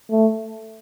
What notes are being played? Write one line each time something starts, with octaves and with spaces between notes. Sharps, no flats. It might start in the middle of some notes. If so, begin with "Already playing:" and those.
A3